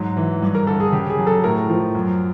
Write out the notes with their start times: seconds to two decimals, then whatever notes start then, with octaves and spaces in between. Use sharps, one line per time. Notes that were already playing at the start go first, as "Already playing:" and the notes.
Already playing: G#2 F#3
0.17 E3
0.42 G2
0.55 A#4
0.67 D3 A4
0.80 G#4
0.92 C#3 G4
1.10 G#4
1.19 F#3
1.27 A4
1.44 A2 A#4
1.69 F3
1.95 F#2